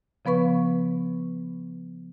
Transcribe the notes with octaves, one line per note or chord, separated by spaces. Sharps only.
C#3 F3 B3 B4 C#6